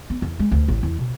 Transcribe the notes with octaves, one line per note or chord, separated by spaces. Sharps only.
B3
E2
G#3
D2
A1
E2
B2